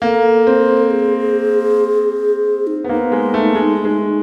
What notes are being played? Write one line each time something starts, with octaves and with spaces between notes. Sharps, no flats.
A#3 A4
C4
G#4
D#4
B3
A#3 D#4
G#3
A3
G#3
G#3